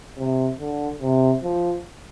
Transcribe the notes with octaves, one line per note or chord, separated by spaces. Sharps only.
C3
D3
C3
F3